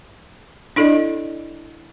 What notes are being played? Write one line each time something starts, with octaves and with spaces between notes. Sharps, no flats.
D4 E4 A4 D5 D#5